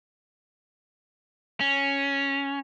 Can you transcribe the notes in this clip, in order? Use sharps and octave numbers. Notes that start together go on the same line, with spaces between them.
C#4